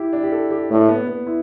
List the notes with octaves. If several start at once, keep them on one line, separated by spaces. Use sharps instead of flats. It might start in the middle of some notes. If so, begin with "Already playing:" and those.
Already playing: E4 G4
D4
G4
A4
G4
A2 D4
B3
B3
E4